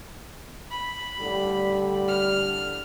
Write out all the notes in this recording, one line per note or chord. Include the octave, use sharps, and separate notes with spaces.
B5
A2 D3 G3
F6